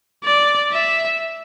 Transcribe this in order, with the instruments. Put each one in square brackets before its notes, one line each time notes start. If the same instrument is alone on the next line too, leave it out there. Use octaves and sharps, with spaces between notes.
[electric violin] D5
E5